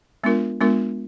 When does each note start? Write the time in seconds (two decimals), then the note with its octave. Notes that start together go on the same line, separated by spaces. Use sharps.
0.24 G#3 B3 D4 F4 A#4
0.61 G#3 B3 D4 F4 A#4